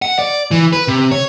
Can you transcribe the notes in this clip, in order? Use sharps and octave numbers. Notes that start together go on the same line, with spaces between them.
F#5
D5
E3
B4
C3
C#5